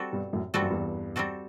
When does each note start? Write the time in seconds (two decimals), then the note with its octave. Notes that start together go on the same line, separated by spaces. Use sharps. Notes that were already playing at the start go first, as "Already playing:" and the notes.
Already playing: G3 C4 F#4 A4
0.12 G2 B2
0.33 F#2 A2
0.54 G2 G3 C4 F#4 A4
0.62 F#2
0.70 E2 G2
1.16 G3 C4 F#4 A4